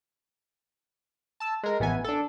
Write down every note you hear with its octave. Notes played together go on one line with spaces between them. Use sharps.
A5 E6
G#3 A#4
A1 E3 B3 G#5
D4 A4